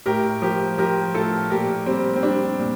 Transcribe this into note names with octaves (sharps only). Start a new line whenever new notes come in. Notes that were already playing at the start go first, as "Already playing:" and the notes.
A2 G4 A#4
F3 G4 A#4
F3 G4 A#4
A2 F4 A4
A#2 G4 A#4
G3 C4
C4
G3 D4
A#2